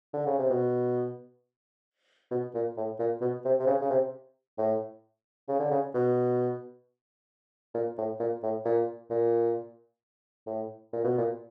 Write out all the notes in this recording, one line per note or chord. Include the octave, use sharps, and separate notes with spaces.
D3
C#3
C3
B2
B2
A#2
A2
A#2
B2
C3
C3
C#3
C#3
C3
A2
C#3
D3
C#3
B2
A#2
A2
A#2
A2
A#2
A#2
A2
A#2
B2
A#2